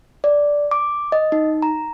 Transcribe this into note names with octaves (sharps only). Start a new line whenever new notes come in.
D5
D6
D#5
D#4
A#5